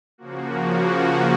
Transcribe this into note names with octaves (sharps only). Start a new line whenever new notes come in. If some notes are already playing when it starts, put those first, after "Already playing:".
C#3 F3 A#3 F#4